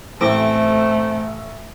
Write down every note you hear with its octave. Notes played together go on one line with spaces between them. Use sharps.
A1 E3 A3 C4 D6